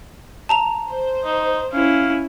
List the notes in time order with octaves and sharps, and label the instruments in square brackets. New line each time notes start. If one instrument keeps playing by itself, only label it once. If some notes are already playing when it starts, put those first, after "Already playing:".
[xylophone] A5 A#5 F7
[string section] C5
[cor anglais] D#4
[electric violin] C#4 E4 [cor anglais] F5